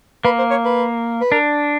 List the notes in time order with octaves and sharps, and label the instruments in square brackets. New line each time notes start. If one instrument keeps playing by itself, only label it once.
[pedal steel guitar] A#3 [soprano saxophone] B4
[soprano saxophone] C5
C#5
B4
B4
[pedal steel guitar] D4 [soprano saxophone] A#4